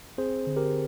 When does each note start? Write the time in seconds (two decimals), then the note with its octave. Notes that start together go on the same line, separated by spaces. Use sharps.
0.18 C4 G#4 C5
0.47 D3
0.56 G4 A#4